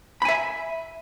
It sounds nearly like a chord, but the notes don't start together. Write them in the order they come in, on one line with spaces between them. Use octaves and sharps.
B5 G#5 E5